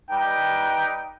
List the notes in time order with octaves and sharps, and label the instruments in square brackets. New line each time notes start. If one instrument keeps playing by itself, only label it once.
[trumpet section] G3 D#4 B4 G5